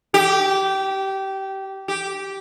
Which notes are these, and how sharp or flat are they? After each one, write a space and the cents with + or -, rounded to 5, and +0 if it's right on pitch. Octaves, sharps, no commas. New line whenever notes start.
G4 -20
G4 -10